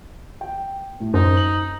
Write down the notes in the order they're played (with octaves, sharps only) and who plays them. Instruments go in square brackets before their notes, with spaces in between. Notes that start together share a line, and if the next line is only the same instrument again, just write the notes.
[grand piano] G5
A2
[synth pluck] F#2 [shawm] D#4 [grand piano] C5
[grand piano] F#7